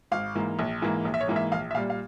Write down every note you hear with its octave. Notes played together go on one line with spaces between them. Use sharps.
G#1 F5
G#2 E3 A#3
A#1
G#2 E3 A#3
A#1
E5
C#5
G#2 E3 A#3
E5
A#1 F5
E5
A#2 G3 F5
F5